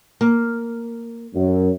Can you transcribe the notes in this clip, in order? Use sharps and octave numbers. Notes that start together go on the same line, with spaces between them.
A#3
F#2